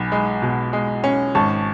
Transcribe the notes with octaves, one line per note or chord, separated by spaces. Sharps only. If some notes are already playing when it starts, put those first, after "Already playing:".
Already playing: B1 G#5 B5
G#3
B2
G#3
C#4
G#1 A5 C#6